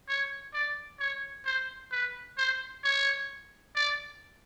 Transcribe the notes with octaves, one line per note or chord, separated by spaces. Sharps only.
C#5
D5
C#5
C5
B4
C5
C#5
D5